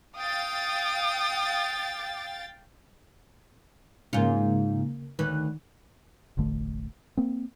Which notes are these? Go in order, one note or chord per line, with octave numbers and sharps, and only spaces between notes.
F5 G5 D#6 A6
G#2 C#3 A#3 F4
D2 D#3 B4
E1 A1 D3 A3
A#3 C4